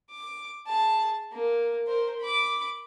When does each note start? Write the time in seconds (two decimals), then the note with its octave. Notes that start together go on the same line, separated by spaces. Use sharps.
0.10 D6
0.66 G#4 A5
1.32 A#3
1.86 A#4 C5
2.21 B5 D6